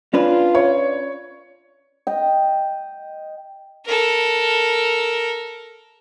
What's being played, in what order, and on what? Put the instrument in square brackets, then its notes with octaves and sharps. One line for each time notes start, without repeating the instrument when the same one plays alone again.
[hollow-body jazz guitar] C#4 D4 B4 [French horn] F4
[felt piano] C#5
[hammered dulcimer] D#5 G5
[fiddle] A4 A#4